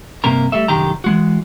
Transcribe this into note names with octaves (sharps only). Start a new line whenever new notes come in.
G2 C3 A#3 A#4 A#5
G3 A3 A4 E5
C2 F#2 D3 D#3 G4 A#5
E3 G#3 F#4